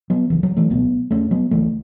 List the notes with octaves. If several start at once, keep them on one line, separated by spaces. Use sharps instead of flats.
F#3 B3
C#2 C#3 E3
F#3
E3 A3
C#2 B2 F#3 B3
E2 C#3 A3 C#4
F#3 B3
C#2 C#3 E3 A3